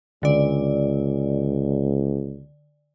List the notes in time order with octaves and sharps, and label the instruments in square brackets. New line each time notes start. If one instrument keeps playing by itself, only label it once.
[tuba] C#2 [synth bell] D3 D5